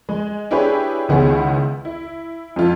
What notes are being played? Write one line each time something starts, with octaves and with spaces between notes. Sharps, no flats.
G#3
D4 E4 G4 G#4 B4 C#5
C#2 D#3 B3 E4 G#4 C#5
E4
F2 F4